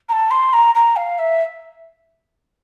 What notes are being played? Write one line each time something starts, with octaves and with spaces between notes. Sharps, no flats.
A#5
A5
C6
A#5
A#5
F5
E5